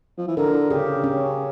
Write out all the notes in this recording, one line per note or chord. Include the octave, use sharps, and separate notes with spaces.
F3
E3
D3 A#4
C#3 G4
C#4